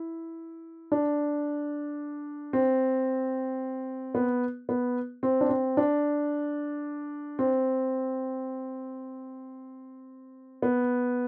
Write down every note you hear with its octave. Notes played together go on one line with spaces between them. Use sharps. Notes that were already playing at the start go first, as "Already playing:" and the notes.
Already playing: E4
D4
C4
B3
B3
C4
D4
C4
D4
C4
B3